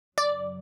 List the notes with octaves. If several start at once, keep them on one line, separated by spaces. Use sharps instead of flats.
F#2 C#3 F#3 D5